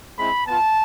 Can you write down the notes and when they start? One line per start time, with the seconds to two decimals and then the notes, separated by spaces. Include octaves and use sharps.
0.18 G#3 C4 E4 B5
0.47 B3 F4 A5